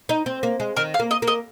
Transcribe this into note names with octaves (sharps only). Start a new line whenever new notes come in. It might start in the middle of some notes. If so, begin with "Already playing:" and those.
D#4
C4
A#3
G#3
D#3 A#4
F5
A#3
D#5
A#3
D#5